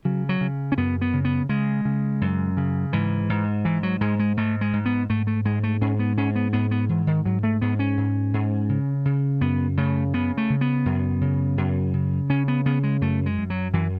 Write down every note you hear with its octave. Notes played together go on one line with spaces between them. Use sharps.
C#3 F#3
F#3
C#3
C#4
F#2 B3
B3
C#3
B3
C#3 G#3
C#3
F#2
C#3
G#2 E3
G#2
G#2 E3
F#3
G#2 G#3
G#3
G#2 A3
G#3
G#2
B3
G#2 A3
A3
G#2 G#3
A3
G#2 C#4
B3
G#2 C#4
B3
G#2 B3
B3
G#2 E3
D#3
G#2 F#3
A3
G#2 B3
C#4
G#2
G#2
C#3
C#3
F#2 B3
C#3 A3
C#3 B3
A3
C#3
B3
F#2
C#3
F#2
C#3
C#3 C#4
B3
C#3 B3
G#3
F#2 A3
G#3
F#2
F#3
F#2 E3